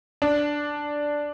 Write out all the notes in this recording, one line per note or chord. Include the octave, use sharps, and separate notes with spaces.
D4